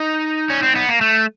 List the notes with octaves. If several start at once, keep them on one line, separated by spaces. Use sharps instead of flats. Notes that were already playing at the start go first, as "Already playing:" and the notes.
Already playing: D#4
C#4
C4
B3
A#3
A3